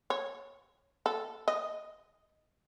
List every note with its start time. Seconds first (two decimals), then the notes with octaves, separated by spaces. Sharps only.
0.10 C#5
1.06 A4
1.48 D#5